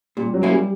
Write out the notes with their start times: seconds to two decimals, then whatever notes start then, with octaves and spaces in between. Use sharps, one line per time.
0.17 A#2 G3
0.34 F#3
0.43 A#3 C#4 E4
0.51 G3